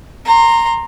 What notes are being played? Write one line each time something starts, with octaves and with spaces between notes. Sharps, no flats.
A#5 C6